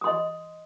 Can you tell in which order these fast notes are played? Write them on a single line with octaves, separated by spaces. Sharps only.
D#6 C6 D#5